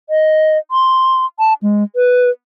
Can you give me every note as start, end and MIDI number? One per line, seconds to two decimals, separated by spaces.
0.10 0.58 75
0.71 1.26 84
1.39 1.53 81
1.62 1.84 56
1.96 2.30 71